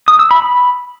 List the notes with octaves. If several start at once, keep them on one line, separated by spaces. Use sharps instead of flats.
D#6
E6
B5
B5